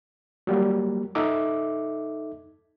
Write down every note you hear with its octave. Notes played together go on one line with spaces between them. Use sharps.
F#3 G3 A#3
D#4 A4 E5 D6